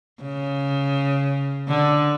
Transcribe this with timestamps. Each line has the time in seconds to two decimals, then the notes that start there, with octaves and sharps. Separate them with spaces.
0.23 C#3
1.68 D3